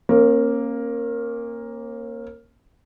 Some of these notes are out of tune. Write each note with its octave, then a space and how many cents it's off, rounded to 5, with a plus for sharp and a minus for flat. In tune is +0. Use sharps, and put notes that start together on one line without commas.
A#3 +0 C#4 -40